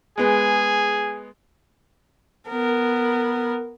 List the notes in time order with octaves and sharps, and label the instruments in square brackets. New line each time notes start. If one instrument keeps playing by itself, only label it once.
[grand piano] G#3 B3 [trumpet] G#4
[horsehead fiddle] B3 A#4